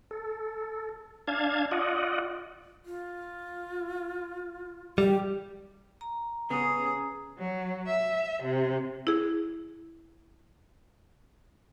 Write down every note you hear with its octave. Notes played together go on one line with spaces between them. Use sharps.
A4
D4 F5 A5 G#6
F4 D5 D#5 F#5
F4
G3 G4
A#5
C#3 B3 C#4 G#4
F#3
E5
C3
E4 G#4